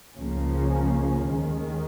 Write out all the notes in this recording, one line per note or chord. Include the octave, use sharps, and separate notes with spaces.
C#2 C#3 F3 A#3 C#4
D#2 D#3 G#3